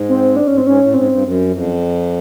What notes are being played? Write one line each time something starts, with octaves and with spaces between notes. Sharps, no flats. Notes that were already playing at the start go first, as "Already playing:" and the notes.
Already playing: G#2
C4
D4
G#2 C#4
C4
G#2 C#4
A2
G#2 C4
G2
F#2
F2